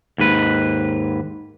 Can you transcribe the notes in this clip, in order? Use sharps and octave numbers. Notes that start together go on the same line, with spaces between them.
D#2 G#2 B4